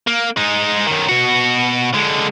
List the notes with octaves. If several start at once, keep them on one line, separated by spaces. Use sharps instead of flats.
A#3
G#3 D#4
F#2 D#3
B2 F#4
D3 G#3